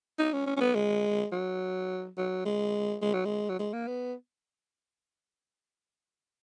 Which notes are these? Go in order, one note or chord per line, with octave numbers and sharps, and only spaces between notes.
D#4
C#4
C#4
C#4
B3
G#3
F#3
F#3
G#3
G#3
F#3
G#3
F#3
G#3
A#3
B3